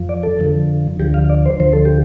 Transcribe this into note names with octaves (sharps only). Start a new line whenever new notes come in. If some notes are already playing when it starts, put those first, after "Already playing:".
Already playing: F2 F3
D5
A4
F2 D3 F3
D2 D3 F3 G4
F5
D5
C5
D2 D3 F3 C5
A4
G4